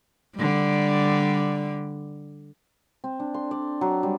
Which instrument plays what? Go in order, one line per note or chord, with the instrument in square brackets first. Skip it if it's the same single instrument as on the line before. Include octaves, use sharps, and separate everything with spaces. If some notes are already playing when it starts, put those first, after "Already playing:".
[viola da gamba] D3 G3
[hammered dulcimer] C4
D4
C6
D5
F#3
G3